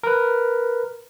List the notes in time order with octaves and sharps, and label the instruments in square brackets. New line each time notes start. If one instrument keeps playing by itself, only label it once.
[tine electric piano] A#4 B4